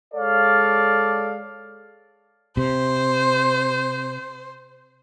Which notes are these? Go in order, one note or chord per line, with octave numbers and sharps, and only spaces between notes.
G#3 A4 C#5 D5 F5
C3 C5